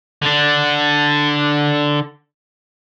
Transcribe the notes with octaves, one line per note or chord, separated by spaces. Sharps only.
D3 D4